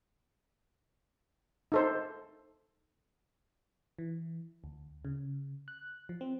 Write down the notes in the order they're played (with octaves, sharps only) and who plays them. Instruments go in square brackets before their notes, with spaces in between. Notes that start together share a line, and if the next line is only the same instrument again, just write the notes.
[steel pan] D#4 A4 C5
[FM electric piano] E3
D2
C#3
F#6
F3
C4